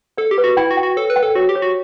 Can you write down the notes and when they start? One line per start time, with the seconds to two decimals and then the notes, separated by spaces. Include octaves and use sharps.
0.18 A4 D5
0.31 G4
0.38 B4
0.44 F#4
0.57 E4 G5
0.71 F#4
0.77 G5
0.83 F#4
0.96 A4 C#5
1.10 B4
1.16 G5
1.23 A4
1.35 F#4 C#5
1.49 G4
1.55 C#5
1.62 F#4